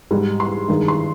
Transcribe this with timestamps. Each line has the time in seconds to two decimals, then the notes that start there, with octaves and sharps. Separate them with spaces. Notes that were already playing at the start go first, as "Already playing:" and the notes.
0.11 G#2 G3
0.40 C6
0.68 G2 D#3 G#3
0.88 C6